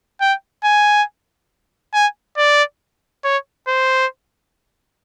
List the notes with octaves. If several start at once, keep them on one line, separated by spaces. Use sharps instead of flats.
G5
G#5
G#5
D5
C#5
C5